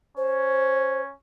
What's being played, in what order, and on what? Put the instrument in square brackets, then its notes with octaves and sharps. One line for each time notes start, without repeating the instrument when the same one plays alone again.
[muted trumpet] C#4 [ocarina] C5